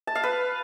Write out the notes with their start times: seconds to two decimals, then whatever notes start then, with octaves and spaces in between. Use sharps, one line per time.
0.07 A5
0.15 F5
0.23 B4